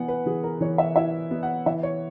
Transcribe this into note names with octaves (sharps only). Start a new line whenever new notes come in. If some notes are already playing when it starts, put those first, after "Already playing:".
Already playing: E3 B3 F#5 G#5
B4
E3 G#4
A#4
E3 C#5
E5
E4 E5
B3
F#5
E3 E5
C#5